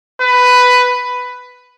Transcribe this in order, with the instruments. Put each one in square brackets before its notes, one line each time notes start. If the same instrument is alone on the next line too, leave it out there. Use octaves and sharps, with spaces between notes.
[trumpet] B4